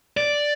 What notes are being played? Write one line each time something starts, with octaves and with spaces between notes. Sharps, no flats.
D5